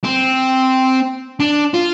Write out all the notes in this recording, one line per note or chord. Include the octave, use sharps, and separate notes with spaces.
C4
D4
F4